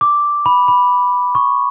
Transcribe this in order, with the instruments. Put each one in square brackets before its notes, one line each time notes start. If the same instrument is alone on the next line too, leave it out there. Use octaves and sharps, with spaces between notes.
[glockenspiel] D6
B5
B5
C#6